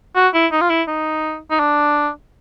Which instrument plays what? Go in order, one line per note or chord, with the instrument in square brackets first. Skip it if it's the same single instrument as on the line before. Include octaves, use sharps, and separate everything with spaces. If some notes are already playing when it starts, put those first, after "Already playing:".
[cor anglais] F#4
E4
D#4
F4
E4
D#4
D#4
D4